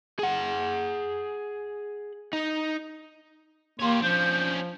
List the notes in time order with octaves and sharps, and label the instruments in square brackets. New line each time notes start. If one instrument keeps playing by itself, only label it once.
[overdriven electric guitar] G#4 F#5
D#4
[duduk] A#3 [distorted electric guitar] G4 C#5 [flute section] C6
[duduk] F3 [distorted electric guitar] C#4 D4 [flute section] G6